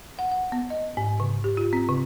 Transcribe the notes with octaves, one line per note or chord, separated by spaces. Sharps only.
F#5
F#5
B3
D#5
G#2
C#3
G4
F4
C4
C#3